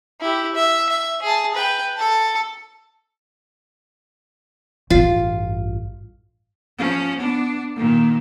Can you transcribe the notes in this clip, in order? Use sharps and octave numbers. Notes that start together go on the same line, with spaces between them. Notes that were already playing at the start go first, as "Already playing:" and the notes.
E4 G4
E5
E5
G#4 A5
B4 G5
A4 A5
A1 G2 F4
F3 C#4
B3 D4
A#2 D#3